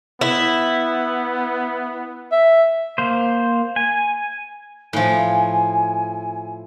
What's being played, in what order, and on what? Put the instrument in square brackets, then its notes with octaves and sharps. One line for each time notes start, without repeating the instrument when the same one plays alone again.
[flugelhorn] B3 [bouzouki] E4
[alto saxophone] E5
[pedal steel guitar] A#3 C5
G#5
[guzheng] A2 F3 [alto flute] G#5